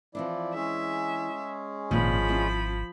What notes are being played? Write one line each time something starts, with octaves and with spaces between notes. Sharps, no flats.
E3 F3 C4 D4 E4 D5
G#3 C#4 G#4 E5
G#1 A#2 F3 B3 C4 B5
C4 E4 F4